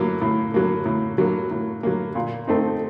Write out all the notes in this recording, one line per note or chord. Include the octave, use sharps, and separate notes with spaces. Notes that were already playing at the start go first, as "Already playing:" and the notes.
Already playing: A2 F#3 A#3
A2
F#3 A#3
A2
F#3 A#3
A2
F#3 A#3
A#2
A3 C4 D#4